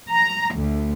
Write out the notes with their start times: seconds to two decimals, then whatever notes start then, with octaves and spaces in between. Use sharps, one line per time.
0.11 A#5
0.55 D2